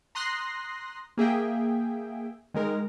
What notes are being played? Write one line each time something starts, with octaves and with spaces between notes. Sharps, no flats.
A#5 C6 D#6 F#6 A#6 C7
A#3 G#4 E5 G5
D#3 G#3 A#4